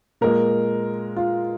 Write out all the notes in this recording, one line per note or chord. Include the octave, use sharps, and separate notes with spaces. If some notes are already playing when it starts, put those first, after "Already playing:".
A#2 G#3 A#4
F4